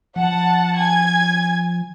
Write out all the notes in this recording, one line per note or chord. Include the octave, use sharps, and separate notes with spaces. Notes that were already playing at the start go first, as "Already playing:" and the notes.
F3 F#5 A5
G#5 G#6